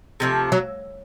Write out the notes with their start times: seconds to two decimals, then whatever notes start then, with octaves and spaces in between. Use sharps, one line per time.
0.20 C3 F3 A3
0.52 F#3